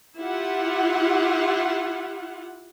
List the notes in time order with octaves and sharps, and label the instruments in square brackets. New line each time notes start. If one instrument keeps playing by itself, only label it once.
[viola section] E4 F4 G4 F#5